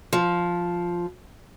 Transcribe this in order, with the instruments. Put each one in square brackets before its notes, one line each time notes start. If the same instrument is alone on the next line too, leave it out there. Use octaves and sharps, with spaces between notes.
[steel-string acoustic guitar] F3